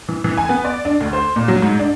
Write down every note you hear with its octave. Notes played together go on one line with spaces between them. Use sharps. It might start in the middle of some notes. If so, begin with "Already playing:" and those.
E3
E3
G#5
B3
D5
D4
D2
C5
A#2
F#3
G#2
D4